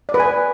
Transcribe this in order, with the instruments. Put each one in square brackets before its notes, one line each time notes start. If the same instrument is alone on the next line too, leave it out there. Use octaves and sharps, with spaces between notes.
[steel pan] D5
B4
G#5